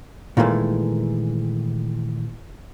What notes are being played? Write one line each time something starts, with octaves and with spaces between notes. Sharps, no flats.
A#2 D#3 E3 G#3 A3